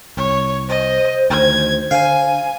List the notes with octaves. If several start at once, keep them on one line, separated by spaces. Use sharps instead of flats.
C2 C#5
C5 D#5
D2 D#3 G#6
D3 F5 G#5